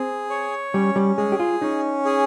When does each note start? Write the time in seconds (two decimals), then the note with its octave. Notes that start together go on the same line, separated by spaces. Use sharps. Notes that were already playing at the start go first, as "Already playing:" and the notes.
Already playing: C4 G#4
0.30 C#5
0.74 G3 C#4
0.96 G3
1.18 G#3 G#4
1.32 G4
1.40 F4
1.62 C#4 D#4
2.05 G#4